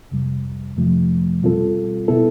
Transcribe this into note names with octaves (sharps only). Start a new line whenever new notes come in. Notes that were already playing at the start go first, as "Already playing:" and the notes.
F2 C3 G3
F2 C3 F3 A3
B2 G3 C4 F4 A4
B2 B3 E4 A4